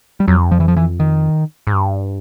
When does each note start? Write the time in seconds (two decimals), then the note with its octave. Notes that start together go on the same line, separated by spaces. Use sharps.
0.20 G3
0.28 F2 F#3
0.51 F3
0.60 E3
0.68 F3
0.77 E3
1.00 D#3
1.67 G#2
1.73 G2